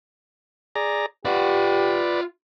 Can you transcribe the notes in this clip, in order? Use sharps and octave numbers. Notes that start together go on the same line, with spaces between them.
G#4 D5 A#5
F4 G4 B4 D5 F#5